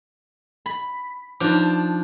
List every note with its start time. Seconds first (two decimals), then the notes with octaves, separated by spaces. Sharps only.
0.66 B5
1.40 F3 D4 D#4 D6